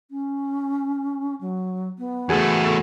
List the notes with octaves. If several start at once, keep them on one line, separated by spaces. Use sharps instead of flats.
C#4
F#3
B3
E2 A3 F#4 G#4 A4